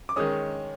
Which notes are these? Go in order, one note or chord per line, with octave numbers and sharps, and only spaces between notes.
D6
D#3 G#3 C#4 D#6